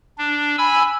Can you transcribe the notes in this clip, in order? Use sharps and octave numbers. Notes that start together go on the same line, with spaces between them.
D4
G#5 B5 E6